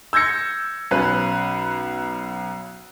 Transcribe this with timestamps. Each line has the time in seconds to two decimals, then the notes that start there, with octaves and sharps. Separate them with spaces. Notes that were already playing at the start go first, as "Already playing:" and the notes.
0.13 E6 G6 G#6 A#6 C#7
0.91 B1 C#4 B4 F#6